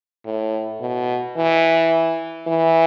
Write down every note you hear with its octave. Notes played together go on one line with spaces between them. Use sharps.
A2
B2
E3
E3